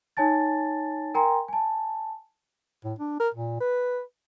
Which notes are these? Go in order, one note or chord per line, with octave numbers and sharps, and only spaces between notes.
D#4 C#5 G#5 A5 A6
A#4 G5 G#5 A#5 C6
G#5 A5
A2
D4
A#4
A#2
B4